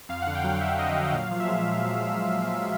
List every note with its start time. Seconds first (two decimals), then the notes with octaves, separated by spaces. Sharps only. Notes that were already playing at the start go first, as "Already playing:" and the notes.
0.09 F2 F5
0.22 D3 F#5
0.35 G5
0.44 F#3 F5
0.61 F#3 E5
0.79 D3 D#5
0.96 F#3 F5
1.13 A#2 F5
1.31 F3
1.40 E5
1.48 G#3